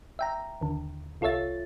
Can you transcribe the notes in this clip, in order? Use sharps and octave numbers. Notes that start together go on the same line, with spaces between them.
E5 G5 A#5
D#2 D3
C2 F4 A4 C#5 E5 A6